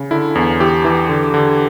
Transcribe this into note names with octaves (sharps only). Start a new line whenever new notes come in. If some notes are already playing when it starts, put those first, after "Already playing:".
Already playing: C#3
D3 E4
E2
E3 G4
E3
D3
D3